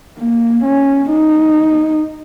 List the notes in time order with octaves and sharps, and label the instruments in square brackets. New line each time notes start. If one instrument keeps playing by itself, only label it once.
[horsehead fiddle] A#3
C#4
D#4